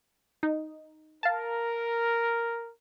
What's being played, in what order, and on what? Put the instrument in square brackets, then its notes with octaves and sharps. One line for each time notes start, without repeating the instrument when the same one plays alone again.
[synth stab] D#4
[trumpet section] A#4 [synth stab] F5 A5